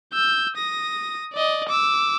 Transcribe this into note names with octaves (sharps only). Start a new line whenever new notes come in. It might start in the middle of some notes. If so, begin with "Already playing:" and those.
E6 G6
D#6 A#6
D5 D#5
D6 E6